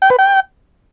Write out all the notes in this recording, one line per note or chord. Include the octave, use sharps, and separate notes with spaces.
G5
B4
G5